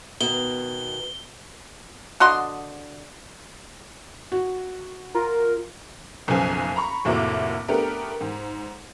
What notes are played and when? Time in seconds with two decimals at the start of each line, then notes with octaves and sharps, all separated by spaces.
0.21 B2 D#3 G7
2.20 D3 F#4 D#5 C6
4.32 F#4
5.15 F4 A#4
6.27 F#1 B1 C#3 F3 B3 G#5
6.76 A#5 B5 C#6
7.05 F1 A2 A#3 F#4 E5 D6
7.68 A3 B3 D4 G4 A#4
8.21 G#2